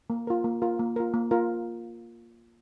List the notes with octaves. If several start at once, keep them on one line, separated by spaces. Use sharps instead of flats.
A#3
F4 A#4
A#3
F4 A#4
A#3
F4 A#4
A#3
F4 A#4